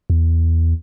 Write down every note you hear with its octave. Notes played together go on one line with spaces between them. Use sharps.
E2